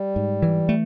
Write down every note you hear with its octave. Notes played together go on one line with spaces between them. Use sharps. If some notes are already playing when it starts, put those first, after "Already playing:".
Already playing: G3
G#2
E3
A3